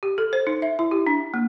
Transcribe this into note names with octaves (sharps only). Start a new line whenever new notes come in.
G4
A4
C5
D#4
E5
E4
G4
D4
A#3